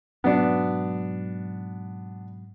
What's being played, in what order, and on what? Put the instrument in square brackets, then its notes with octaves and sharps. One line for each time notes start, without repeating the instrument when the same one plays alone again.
[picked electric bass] G#2 B2 F#3 [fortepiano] B3 D4